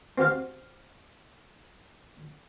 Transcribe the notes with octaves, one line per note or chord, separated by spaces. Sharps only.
C4 F#4 G4 F5